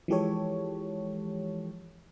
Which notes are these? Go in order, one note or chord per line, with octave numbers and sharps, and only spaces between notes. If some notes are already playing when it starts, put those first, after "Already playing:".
E3 F3 G#3 G4 A4 C#5